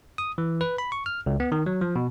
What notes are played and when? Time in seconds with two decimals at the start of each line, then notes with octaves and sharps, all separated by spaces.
0.18 D#6
0.38 E3
0.61 B4
0.78 B5
0.92 C#6
1.06 F6
1.26 C#2
1.40 B3
1.52 D#3
1.66 F#3
1.81 F3
1.96 B2